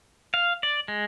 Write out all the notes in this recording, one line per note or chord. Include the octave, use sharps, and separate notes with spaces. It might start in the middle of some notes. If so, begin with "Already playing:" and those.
F5
D5
G#3